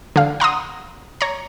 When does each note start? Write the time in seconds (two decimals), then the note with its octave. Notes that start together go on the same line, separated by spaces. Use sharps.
0.16 D3 F5
0.40 F#5 A#5 C6 D#6
1.21 C#5 A#5